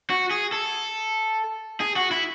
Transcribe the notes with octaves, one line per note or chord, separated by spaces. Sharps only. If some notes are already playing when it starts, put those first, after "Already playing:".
F#4
G#4
A4
G#4
F#4
E4